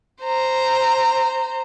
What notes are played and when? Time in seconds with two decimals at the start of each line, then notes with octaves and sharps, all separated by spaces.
0.22 C5 A#5